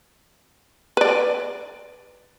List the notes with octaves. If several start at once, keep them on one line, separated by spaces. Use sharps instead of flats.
B4 D5